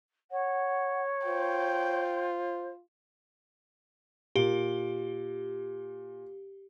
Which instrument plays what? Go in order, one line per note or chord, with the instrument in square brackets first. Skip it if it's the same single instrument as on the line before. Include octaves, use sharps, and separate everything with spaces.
[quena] C#5 [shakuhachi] F#5
[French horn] F4 [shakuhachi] C5 [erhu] G5
[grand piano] A#2 [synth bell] G4